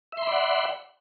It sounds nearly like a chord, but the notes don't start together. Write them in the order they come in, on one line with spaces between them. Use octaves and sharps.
E5 C6 B5 D5 F#5